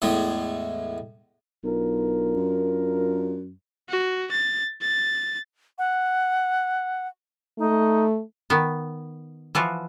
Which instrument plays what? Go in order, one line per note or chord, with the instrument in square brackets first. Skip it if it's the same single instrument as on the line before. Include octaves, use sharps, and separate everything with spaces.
[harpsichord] E2 A2 G#3
[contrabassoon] B1 [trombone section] D4 F4 A#4
[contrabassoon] F#2
[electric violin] F#4
A6
A6
[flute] F#5
[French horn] A3 [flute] D#4
[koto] D#3 B3
E3 F3 F4 F#4